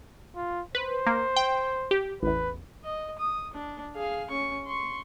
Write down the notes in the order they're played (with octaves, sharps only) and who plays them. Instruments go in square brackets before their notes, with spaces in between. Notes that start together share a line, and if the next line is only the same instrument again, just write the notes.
[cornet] F4
[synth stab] B4 [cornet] C5
[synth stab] A#3
G5
G4
[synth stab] A1 E2 [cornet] B4
[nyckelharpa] D#5
D#6
D4
G#4 F5
C#4 C#6
C6 C#6